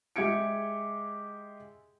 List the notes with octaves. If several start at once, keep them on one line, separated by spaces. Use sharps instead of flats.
G#3 G4 E5 G#6 C#7 D7